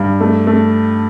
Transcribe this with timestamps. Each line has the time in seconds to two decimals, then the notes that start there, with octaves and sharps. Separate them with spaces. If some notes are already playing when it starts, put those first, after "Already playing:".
Already playing: G2
0.20 A3
0.47 A3